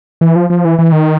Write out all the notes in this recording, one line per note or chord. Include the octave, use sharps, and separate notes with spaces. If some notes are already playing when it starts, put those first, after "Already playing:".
E3
F3
F3
E3
E3
D#3